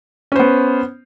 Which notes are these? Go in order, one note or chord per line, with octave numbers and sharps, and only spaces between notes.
B3 C#4 C5